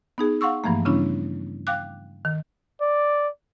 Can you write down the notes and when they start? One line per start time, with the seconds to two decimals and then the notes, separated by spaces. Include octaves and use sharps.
0.18 B3 D#4 G#4
0.41 F5 F#5 C6 C#6 E6
0.64 G2 E3 F3 A3 A#3
0.85 C#3 G3 B3 C#4 D4 E4
1.67 F5 G5 D6 F#6
2.25 D#3
2.81 D5